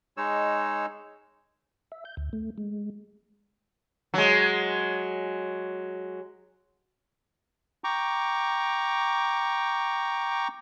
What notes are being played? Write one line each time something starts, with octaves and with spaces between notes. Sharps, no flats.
G#3 D#4 C#5 E6
E5
G6
D2
A3
G#3
F#3 G#3
G5 A#5 C#6 D6